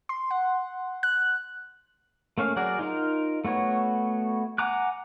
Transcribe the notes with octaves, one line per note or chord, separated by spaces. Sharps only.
C6
F#5
F#6
A3 A#3 C#4 F5
F#3 F#4 G#4 A#4 D5
D#4 F4 A#4
A3 B3 F#4 C#5
F#5 G#5 A#5 D6 F#6